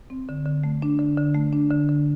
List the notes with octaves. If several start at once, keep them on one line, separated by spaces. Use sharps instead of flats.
C4
D3
D3
A3
D4
D3
D3
A3
D4
D3
D3